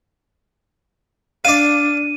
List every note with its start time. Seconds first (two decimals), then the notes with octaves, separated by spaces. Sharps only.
1.45 D4 D5 F5 D#7